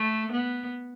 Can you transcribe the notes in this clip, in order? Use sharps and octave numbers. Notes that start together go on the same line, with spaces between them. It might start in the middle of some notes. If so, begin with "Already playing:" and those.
Already playing: A3
B3